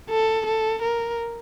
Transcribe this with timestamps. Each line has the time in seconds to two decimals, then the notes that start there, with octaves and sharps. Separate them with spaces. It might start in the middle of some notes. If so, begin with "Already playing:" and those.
0.10 A4
0.46 A4
0.82 A#4